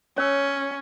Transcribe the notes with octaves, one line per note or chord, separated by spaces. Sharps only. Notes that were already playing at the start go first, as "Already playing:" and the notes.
C#4 C#5 E6